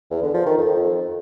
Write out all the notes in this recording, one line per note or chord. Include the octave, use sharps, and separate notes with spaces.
E2
D3
F3
D#3
F2